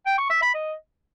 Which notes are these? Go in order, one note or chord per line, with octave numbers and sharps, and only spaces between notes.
G5
C#6
E5
B5
D#5